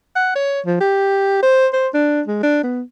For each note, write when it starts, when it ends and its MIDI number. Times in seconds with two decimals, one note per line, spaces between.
0.16 0.34 78
0.36 0.61 73
0.66 0.76 53
0.81 1.39 67
1.42 1.68 72
1.73 1.88 72
1.94 2.22 62
2.28 2.42 56
2.43 2.62 62
2.64 2.82 59